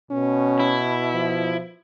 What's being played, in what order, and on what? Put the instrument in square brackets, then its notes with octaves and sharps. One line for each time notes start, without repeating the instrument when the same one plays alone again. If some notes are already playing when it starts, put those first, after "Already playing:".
[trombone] B2 [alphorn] C#4
[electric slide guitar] E4
[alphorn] F3